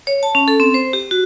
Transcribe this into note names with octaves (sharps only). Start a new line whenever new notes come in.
C#5
A5
C#4
A4
C4
C5
G4
F#4